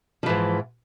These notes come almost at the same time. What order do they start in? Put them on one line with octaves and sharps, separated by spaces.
F3 E3 G#2